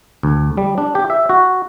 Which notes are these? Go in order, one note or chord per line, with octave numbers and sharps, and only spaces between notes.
D2
G3
D4
G4
E5
F#4